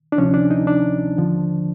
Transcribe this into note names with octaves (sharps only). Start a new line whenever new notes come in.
D4
D2 C3 F3 C#4
D4
D#4
D4
D#2 D3 F3